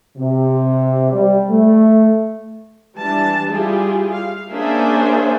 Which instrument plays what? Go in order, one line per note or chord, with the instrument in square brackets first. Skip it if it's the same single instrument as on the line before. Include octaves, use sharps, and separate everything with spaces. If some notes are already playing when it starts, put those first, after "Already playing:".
[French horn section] C3
G3
A3
[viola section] E3 G3 D4 A5
G3 E4 F4 G4 G#4
F5
A#3 C#4 D4 G#4 C5 E5